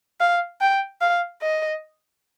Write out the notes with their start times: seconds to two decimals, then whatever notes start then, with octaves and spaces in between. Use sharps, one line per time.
0.20 F5
0.61 G5
1.01 F5
1.42 D#5